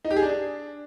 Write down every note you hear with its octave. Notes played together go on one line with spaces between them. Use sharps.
D#4
G4
G#4
D4